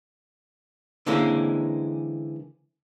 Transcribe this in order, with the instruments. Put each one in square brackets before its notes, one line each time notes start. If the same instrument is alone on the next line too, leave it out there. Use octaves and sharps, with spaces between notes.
[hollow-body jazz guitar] D3 E3 G#3 A#3 C4 C#4